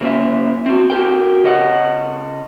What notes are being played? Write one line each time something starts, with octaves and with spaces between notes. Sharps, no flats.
C#3 A#3 C#4 E5
C4 F#4
F#4 G4 A#4 G5
C#3 D#5 F#5